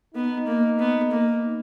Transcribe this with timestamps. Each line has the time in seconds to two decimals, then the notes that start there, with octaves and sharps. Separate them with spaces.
0.15 B3 D#4
0.47 A#3
0.79 B3
1.11 A#3